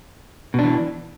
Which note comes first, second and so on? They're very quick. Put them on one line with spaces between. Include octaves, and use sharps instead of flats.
B2 D4 E3